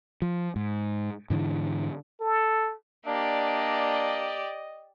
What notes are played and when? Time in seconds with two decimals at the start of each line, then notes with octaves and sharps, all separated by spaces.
0.22 F3
0.56 G#2
1.30 G#2 D3 E3
2.21 A4
3.06 A#3 D4 G4 D5 D#5